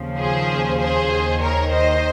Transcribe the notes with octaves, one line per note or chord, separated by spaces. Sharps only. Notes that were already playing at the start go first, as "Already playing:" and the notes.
Already playing: D#2 C#3 F3
G#4 C5
G#4 C5
D#2 D#3
A#4 C#5
C5 D#5